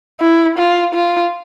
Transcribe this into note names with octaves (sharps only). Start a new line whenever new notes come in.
E4
F4
F4